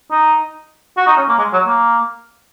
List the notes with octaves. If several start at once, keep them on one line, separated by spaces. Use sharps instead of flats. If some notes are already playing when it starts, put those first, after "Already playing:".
D#4
F#4
D#4
C#4
A#3
G#3
F#3
A#3